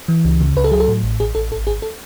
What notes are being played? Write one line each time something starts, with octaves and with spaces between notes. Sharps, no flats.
E3
C#2
C#3
C#2 B4
A4
F#3 G#4
A4
A2
A1
A1 G#4
A1 A4
G#1 A4
G#1 G#4
A4